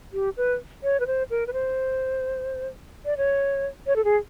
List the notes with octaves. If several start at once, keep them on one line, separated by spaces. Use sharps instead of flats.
G4
B4
C#5
B4
C5
A#4
B4
C5
D5
C#5
C#5
A4
G#4